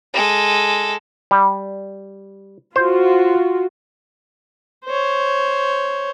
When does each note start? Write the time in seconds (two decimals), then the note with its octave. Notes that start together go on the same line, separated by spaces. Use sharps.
0.13 G#3 A4
1.31 G3
2.76 F4 F#4 C5
4.85 C5 C#5